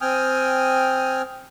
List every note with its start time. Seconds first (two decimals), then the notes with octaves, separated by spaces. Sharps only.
0.01 C4 G5 G#5 D#6 F6